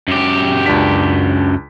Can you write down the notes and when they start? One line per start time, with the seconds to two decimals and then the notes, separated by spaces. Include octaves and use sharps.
0.08 F#2 G4
0.66 C#2 D4 B6